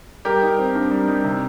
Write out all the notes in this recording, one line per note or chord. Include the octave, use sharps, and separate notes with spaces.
G3 G4 A#4
D#4
C4
G2
G3
D#4
C3